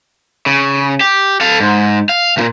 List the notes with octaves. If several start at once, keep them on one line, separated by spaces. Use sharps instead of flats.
C#3
G4
A4 F5
G#2
F5
D2 A#2